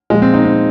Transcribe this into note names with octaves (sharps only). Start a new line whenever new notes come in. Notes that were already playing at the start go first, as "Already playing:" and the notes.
A#2 F3 G#3
C4
D#4
C4